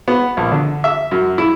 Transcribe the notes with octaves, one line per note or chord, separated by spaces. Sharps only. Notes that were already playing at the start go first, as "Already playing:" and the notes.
B3
A#1
D3
E5
F#2
E4